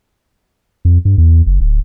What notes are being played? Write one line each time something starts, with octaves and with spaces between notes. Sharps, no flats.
F2
G2
E2
F#1
D1